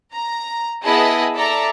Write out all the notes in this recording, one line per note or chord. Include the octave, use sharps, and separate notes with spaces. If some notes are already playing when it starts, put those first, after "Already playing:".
A#5
B3 E4 G#4 D#5 A5 B5
A4 D5 E5 A5 A#5